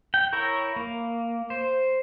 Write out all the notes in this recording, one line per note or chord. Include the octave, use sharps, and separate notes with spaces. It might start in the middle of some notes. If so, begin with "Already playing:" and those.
G5
E4 A#4 C#5
A#3
C5